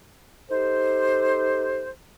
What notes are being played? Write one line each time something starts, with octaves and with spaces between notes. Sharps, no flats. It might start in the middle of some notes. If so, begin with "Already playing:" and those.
D#4 G4 A4 C5